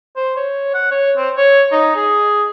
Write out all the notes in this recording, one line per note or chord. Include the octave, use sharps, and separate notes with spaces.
C5
C#5
F#5
C#5
C4
C#5
D#4
G#4